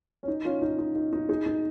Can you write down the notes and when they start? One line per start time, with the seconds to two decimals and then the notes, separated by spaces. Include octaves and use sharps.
0.23 C#4
0.28 D#4
0.45 C#4 F4
0.62 D#4
0.79 D#4
0.95 D#4
1.13 D#4
1.29 D#4 G#4
1.46 D#4